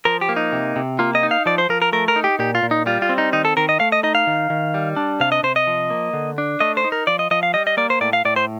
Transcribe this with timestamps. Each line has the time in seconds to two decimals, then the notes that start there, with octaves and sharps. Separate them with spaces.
0.05 F3 A#4
0.21 G4
0.29 A#3
0.36 D#4
0.52 C3
0.76 C3
0.99 A#3 F4
1.15 D#5
1.23 D#4
1.31 F5
1.46 F3 D5
1.58 C5
1.69 F3 A#4
1.82 A#4
1.93 A3 A#4
2.08 A#4
2.16 D#4
2.24 G4
2.39 A#2 G4
2.55 F4
2.63 A#2
2.71 D#4
2.86 G3 F4
3.02 F4
3.09 C4
3.18 D#4
3.33 D#3 D#4
3.45 A4
3.57 D#3 A#4
3.69 D#5
3.80 A3 F5
3.92 D#5
4.03 D#4 D#5
4.15 F5
4.27 D#3
4.50 D#3
4.74 G3
4.96 D4
5.20 C3 F5
5.32 D#5
5.43 C3 C5
5.56 D#5
5.67 F3
5.90 A#3
6.13 D3
6.38 D4
6.60 A3 D#5
6.77 C5
6.84 D#4
6.92 A#4
7.07 F3 D5
7.19 D#5
7.31 F3 D#5
7.43 F5
7.54 G3 D#5
7.67 D#5
7.77 A#3 D5
7.90 C5
8.01 A2 D5
8.13 F5
8.25 A2 D5
8.36 C5